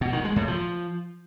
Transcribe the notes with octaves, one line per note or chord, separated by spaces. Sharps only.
B2
D#3
G#3
A2
F3